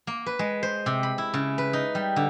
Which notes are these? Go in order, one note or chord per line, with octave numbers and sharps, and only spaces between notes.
A#3
B4
G#3
C5
C3
B5
E4
C#3
B4
D#4
G3
D3